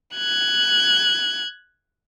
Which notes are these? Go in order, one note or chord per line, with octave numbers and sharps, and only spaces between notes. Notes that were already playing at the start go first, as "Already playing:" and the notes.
F#6 G#6